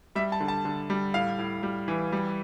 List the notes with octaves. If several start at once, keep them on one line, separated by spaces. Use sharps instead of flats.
G3 E5
A5
D3
A5
D3
G3
A2 F5
A2
G3
E3
G3